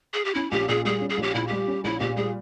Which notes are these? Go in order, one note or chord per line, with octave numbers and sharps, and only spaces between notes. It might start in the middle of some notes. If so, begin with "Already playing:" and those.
G#4
G4
C#4 E4
A#1 G4
A#2 G#4
G3 G#4
C#4
G#4
A#1 G4
A#2 E4
G3 G4
C#4
A#1 E4
A#2 G4
G3 G#4